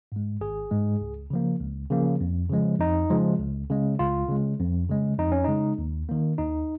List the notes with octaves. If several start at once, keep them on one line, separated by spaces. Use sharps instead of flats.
G#2 G#3
G#1 G#4
G#2 G#3
C#2
C#3 F3 A#3
C#2
C#3 F3 A#3
F2
C#3 F3 G#3
F2 D#4
C#3 F3 G#3
C#2
C#3 G#3
C#2 F4
C#3 G#3
F2
C#3 G#3
F2 D#4
C#4
C#3 G#3 D#4
D#2
D#3 A#3
D#2 D#4